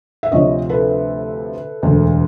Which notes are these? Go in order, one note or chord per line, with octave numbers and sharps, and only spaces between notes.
E5
D2 C3 F3 C#5 D#5
A4 B4
E1 D2 D3